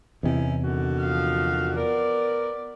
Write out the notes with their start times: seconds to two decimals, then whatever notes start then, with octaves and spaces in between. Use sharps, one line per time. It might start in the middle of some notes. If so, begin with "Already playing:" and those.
0.23 E2 C3 C#4 D#4 E4
0.63 D3 D#3 F#4
1.01 F3 F5
1.76 B3 A#4 D5